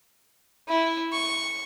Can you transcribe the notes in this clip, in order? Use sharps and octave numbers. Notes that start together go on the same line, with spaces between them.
E4
C#6